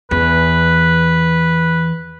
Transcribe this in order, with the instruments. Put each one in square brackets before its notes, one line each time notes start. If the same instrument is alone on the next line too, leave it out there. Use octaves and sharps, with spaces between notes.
[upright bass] E2 [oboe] B4